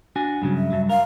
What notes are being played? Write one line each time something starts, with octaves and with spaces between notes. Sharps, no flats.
D4 F#4 G#5
G2 C#3 F#3
E5
G2 F#3
A#4 F5